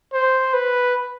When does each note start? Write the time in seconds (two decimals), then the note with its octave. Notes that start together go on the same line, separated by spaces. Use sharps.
0.13 C5
0.53 B4